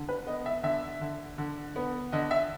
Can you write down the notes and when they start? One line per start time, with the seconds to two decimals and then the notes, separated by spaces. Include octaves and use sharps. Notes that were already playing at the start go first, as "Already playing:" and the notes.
Already playing: D3
0.09 B4
0.26 B3 D#5
0.46 E5
0.63 D3 E5
1.01 D3
1.38 D3
1.76 B3
2.12 D3 D#5
2.31 E5